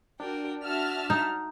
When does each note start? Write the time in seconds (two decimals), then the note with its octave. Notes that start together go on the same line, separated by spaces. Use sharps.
0.20 D4 F#4 A#4 G5
0.64 F#4 E5 A5 F6
1.10 D#4